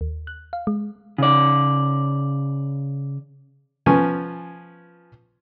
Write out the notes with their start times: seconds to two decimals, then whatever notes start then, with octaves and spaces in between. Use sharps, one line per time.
0.01 D#2
0.27 F#6
0.53 F5
0.67 G#3
1.18 C#3 D5
3.86 F3 B3 C#4 G#5